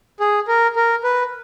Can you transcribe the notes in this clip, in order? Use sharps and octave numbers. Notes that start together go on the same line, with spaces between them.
G#4
A#4
A#4
B4